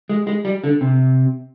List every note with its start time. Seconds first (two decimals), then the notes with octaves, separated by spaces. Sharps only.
0.09 G#3
0.27 G#3
0.45 G3
0.64 D3
0.81 C3